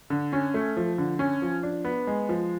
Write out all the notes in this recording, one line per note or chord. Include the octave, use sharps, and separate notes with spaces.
D3
C#4
A3
F3
D3
C#4
F3
D4
B3
G#3
F3